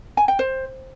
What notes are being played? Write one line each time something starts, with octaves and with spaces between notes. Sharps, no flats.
G#5
G5
C5